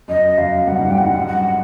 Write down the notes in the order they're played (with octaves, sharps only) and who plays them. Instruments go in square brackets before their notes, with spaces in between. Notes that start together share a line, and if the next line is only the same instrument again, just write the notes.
[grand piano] F#2 [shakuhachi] D#5
[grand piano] F#2 [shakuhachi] F5
[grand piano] G2 [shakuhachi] F#5
[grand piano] G#2
[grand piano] G2 [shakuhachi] G5
[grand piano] G#2 [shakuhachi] F#5
[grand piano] G2
[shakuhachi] F#5